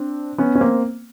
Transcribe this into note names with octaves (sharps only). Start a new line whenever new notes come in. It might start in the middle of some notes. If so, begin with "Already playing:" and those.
Already playing: C4 D4
B3 C#4
C#4
A#3 C4